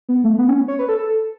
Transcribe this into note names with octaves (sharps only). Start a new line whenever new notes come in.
B3
A3
B3
C#4
C#5
B4
A4
A4